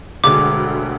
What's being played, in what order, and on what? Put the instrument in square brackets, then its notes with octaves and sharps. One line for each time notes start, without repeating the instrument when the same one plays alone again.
[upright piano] E1 D2 D3 G#3 [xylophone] D6